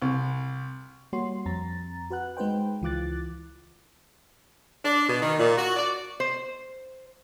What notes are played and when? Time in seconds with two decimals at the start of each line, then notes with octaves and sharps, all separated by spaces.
0.02 C2
1.13 G3 A#3 F#4 C#5 C6 C7
1.46 F2 C4 A#5 A6
2.10 F#4 B4 F#5 F#6
2.37 G#3 D#4 B4 C5 G5
2.82 C#2 E3 F4 D6 F#6 A6
4.85 D4
5.08 B2
5.21 D#3
5.38 A#2
5.57 F#4
5.76 D5
6.20 C5